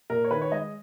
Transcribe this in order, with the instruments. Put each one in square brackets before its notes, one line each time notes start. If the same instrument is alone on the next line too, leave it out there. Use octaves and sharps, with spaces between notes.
[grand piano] A#2 A#4
C#5
D#3 B4
C#5
G#3 D#5